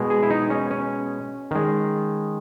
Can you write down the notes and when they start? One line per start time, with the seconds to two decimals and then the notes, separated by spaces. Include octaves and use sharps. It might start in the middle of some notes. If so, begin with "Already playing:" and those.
Already playing: B2 G#3
0.10 G#4
0.23 E4
0.30 D#4
0.50 C#4
0.70 C#4
1.51 D#3 G#3